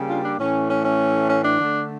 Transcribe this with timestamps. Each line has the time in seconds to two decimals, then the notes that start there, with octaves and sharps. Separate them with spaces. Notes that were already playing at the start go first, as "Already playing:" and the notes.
Already playing: C#3 G3 A#3
0.09 D4 F4
0.23 D4
0.39 A2 E3 A3 C#4
0.69 C#4
0.84 C#4
1.29 C#4
1.44 D4
1.59 D3 A3